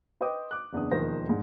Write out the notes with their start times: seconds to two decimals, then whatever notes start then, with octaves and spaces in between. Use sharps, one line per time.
0.21 B4 C5 D#5 G5 D6 D#6
0.51 D6 F#6
0.73 F#1 E2 D4 D#6
0.91 E1 D#2 D#3 F3 C5 A#6
1.27 A#1 G#2